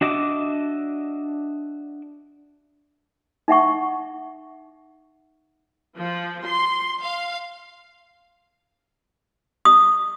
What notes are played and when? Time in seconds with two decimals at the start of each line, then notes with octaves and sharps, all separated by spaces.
0.01 D4 F#4 D#5 E5 D6
3.48 D#4 E5 F#5 C#6
5.97 F3
6.45 C6
7.01 F5
9.65 D#6